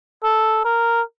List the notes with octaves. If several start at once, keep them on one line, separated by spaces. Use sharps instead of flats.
A4
A#4